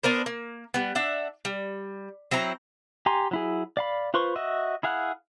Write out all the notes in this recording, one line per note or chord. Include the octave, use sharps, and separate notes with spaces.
B3 D4 A#4 C5
A#3
G3 B3
D4 E5 F#5
G3
F#3 C4 E4 A#5
G4 G#5 A#5 C6
F#3 E4 G#4
D5 F5 B5
F4 B4 C5 C6 C#6
F#4 D#5 E5
E4 G#4 F5 F#5